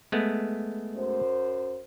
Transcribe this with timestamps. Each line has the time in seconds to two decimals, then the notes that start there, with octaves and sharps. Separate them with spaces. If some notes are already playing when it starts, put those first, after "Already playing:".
0.12 G#3 A3 B3
0.95 F#2 C5